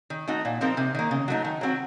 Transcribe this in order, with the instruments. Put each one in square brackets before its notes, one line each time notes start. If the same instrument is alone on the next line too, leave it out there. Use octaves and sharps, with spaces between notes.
[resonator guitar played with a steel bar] D#3
A3 D#4 F#4
A#2
F3 C4 D#4 A#4
C3
D#3 A#3
C#3
F#3 A3 D#4
D#3
F#3 C4 F#4